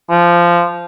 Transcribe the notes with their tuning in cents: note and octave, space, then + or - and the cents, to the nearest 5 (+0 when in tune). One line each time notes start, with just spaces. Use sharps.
F3 -15